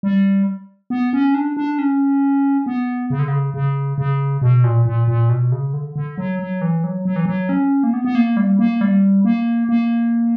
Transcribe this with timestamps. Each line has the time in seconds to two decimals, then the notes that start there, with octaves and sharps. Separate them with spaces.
0.03 G3
0.90 B3
1.13 C#4
1.35 D4
1.57 D4
1.79 C#4
2.66 B3
3.10 C#3
3.19 D3
3.28 C#3
3.54 C#3
3.98 C#3
4.42 B2
4.64 A#2
4.85 A#2
5.08 A#2
5.29 B2
5.52 C#3
5.73 D3
5.96 D3
6.18 F#3
6.39 F#3
6.61 E3
6.84 F#3
7.05 F#3
7.16 E3
7.26 F#3
7.49 C#4
7.83 A#3
7.93 B3
8.05 B3
8.15 A#3
8.37 G3
8.59 A#3
8.81 G3
9.25 A#3
9.69 A#3